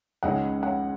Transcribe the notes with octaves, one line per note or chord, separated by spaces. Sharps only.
C#2 C#3 G#3 D#4 F#5
F#5